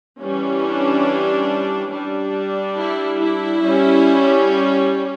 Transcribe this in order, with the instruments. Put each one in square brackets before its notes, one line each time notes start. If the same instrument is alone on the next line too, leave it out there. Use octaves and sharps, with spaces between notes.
[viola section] E3 G3 C#4
D4
G3 D4
E4
E4
G3 C#4